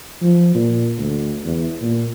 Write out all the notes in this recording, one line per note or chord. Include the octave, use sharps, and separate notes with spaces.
F3
A#2
D2
E2
A#2